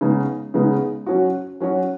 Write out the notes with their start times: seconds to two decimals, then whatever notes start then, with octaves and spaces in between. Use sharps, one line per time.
0.01 C#3 G#3 B3 D#4
0.54 C#3 G#3 B3 D#4
1.06 F#3 C#4 F#4
1.60 F#3 C#4 F#4